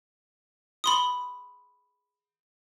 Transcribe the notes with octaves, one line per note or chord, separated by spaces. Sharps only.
B5 C6 D#6